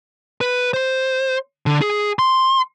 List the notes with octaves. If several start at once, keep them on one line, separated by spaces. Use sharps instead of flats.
B4
C5
D3
G#4
C6